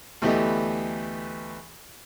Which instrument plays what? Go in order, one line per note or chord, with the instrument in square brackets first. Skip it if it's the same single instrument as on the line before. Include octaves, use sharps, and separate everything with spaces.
[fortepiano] D2 E3 A3 B3 G4 D#5